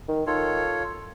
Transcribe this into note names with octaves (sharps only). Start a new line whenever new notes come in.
D#3
D#3 F4 A4 C#5